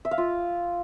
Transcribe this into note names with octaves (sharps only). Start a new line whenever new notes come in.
E5
F5
F4